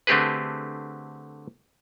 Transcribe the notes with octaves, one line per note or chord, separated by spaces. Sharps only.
D3 A3 C4 G4 G#4 B4